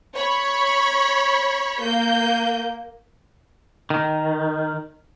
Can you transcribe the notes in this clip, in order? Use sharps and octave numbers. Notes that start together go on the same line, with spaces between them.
C#5 B5
A#3 G6
D#3